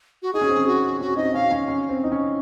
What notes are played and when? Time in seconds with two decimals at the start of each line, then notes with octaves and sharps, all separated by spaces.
0.22 F#4
0.34 D#4 G#4
0.41 C#4
0.49 C4
0.57 C#4
0.67 F#4
1.01 C#4 F#4
1.17 C4 D#4 D#5
1.34 C#4 F5
1.51 C#4
1.68 C#4
1.89 C4
2.04 D#4
2.12 C#4